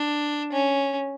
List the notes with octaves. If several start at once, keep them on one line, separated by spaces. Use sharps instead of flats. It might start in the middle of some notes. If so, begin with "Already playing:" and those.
Already playing: D4
C#4